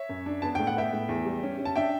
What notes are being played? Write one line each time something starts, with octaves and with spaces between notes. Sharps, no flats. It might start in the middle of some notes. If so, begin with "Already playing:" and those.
Already playing: C#5 E5
F#2
D4
B3 A5
A2 G5
F#5
B3 E5 G5
A2
E2
G3
C#4
C#4
A5
D4 E5 G5